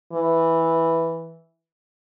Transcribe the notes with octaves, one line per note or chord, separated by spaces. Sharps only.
E3